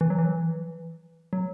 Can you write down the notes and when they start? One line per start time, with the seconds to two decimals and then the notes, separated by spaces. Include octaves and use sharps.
0.01 E3
0.10 F#3
0.18 E3
1.33 F#3